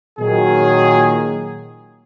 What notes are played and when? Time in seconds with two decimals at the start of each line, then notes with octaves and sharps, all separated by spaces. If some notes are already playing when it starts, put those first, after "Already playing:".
0.19 A#2 D#3 F#3 G#4